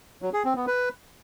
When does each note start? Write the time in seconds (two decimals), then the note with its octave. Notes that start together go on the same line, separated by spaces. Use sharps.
0.22 F#3
0.33 G#4
0.45 C4
0.56 B3
0.67 B4